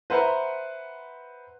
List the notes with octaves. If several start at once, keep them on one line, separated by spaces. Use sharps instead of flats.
B4 C5 E5 F#5 A#5